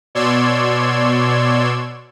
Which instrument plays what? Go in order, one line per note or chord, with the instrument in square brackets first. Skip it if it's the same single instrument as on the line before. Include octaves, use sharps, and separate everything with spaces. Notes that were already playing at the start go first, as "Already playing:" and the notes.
[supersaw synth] B2 C#5 D5 C6 E6 G#6